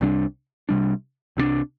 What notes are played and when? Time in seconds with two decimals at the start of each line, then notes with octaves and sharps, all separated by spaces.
0.01 C2 C3 G3 D4
0.69 C2 C3 G3 D4
1.37 C2 C3 G3 D4